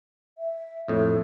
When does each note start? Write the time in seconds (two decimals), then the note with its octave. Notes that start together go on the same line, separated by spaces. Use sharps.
0.38 E5
0.88 F2 A2 A4